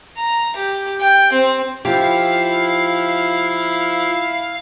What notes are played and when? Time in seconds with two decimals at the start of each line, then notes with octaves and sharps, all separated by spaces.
0.18 A#5
0.56 G4
1.01 G5
1.32 C4
1.85 F3 E4 G4 F5